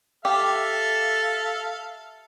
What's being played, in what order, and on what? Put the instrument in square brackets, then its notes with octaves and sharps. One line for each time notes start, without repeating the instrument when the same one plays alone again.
[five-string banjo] G4 [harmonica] A4 E5 F5